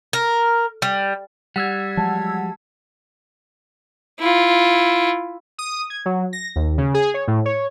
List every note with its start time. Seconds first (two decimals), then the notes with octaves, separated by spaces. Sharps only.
0.13 A#4
0.82 G3
1.56 G3 F#5 E6 G#6
1.97 F3 F#3 G#3 A5
4.19 E4 F4
5.58 D#6
5.90 G#6
6.06 F#3
6.33 A#6
6.56 D#2
6.78 C#3
6.94 G#4
7.14 C#5
7.28 A2
7.45 C#5